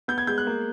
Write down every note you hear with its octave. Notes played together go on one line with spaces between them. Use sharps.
B3 G6
G#6
G#3 G6
F#6
A#3